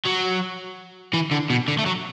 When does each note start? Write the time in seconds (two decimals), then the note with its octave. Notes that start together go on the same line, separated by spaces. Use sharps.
0.06 F#3
1.14 E3
1.31 D3
1.50 B2
1.68 D3
1.79 A3
1.86 F#3